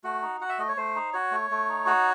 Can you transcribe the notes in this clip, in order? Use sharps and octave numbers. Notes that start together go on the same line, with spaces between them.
A3 F#4
D#4
F#4 F#5
E5
A3 D#5
C#5
A3 C5
D#4
F#4 C#5
A3
A3
D#4
F#4